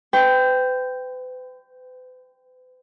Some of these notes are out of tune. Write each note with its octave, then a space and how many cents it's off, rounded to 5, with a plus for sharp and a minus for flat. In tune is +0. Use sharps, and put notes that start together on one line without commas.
B4 +45 G5 +0 C#6 +0